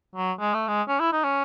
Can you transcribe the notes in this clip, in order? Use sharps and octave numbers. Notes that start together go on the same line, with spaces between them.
F#3
G#3
A3
G#3
C#4
E4
D#4
C#4